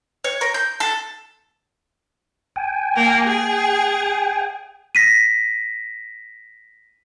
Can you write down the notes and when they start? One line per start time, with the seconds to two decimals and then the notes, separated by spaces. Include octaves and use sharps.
0.24 C#5
0.41 A#4
0.54 G6
0.80 A4
2.56 G5 G#5
2.96 A#3 A#4
3.27 G#4
4.95 A#6 B6 D#7